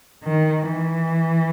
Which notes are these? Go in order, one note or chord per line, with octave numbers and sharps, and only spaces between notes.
D#3
E3